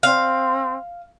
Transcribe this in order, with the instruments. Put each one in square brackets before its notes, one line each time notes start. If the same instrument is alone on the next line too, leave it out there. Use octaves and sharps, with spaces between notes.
[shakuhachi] C4 [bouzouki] F5